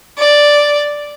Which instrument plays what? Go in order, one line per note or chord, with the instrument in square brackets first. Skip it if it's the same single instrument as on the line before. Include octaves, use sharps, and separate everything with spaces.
[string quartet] D5